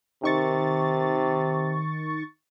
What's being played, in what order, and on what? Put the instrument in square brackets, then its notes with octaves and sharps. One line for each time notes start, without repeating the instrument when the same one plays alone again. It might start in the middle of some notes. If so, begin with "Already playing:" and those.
[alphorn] C3 [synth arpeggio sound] D#3 C#6 A6